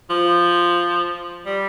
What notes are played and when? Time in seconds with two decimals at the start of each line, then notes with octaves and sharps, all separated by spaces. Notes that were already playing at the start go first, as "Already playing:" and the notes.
0.10 F3
1.46 G3